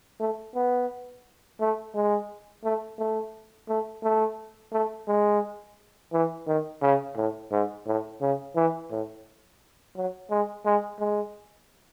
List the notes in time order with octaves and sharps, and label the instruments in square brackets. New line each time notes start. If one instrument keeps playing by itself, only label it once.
[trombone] A3
B3
A3
G#3
A3
A3
A3
A3
A3
G#3
E3
D#3
C#3
A2
G#2
A2
C#3
E3
A2
F#3
G#3
G#3
G#3